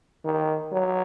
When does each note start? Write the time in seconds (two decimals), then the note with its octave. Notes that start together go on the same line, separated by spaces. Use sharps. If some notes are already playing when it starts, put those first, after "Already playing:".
0.25 D#3
0.72 F#3